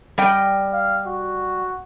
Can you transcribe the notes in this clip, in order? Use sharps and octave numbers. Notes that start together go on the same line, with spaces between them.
G3 D#5 G5
F5
F#4